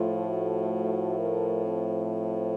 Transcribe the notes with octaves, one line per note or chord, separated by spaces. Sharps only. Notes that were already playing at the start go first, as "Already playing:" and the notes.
Already playing: A2 F3 A3 F4
F#4
A#4
C4